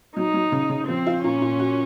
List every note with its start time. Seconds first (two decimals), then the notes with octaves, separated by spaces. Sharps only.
0.16 F#3 D#4
0.34 F#3
0.52 C#3
0.70 C#3
0.87 F3 C4
1.06 F4
1.23 A#2 C#4
1.42 A#2
1.59 F#4